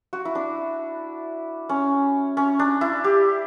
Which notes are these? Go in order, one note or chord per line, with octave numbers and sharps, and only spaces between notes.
F#4
E4
D4
C#4
C#4
D4
E4
G4